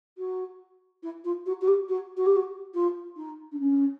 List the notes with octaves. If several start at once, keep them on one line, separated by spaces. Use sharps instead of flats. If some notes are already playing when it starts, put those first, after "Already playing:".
F#4
E4
F4
F#4
F#4
G4
F#4
F#4
G4
F#4
F4
D#4
D4
C#4